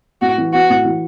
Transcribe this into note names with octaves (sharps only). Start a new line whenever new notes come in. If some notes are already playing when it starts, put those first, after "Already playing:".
A2 F#4
E3
B3 F#4
A2
E3